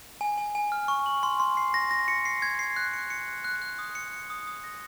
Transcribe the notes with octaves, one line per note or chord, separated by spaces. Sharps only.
G#5
G#5
G#5
F6
C#6
F#7
C6
C6
C7
A#6
A#6
C#7
C7
G#6
C7
F#6
C#7
C#7
F#6
F#6
F#6
D#6
C#7
C#7
D#6
D#6
A#6